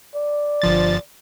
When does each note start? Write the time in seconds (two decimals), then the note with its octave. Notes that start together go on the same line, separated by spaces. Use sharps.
0.15 D5
0.62 G1 F3 A6